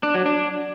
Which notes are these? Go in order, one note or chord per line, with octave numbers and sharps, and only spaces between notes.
D4
F#3
D4